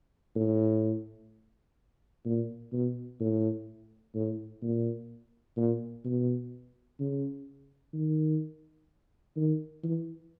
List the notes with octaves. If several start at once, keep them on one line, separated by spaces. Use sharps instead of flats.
A2
A#2
B2
A2
A2
A#2
A#2
B2
C#3
D#3
D#3
E3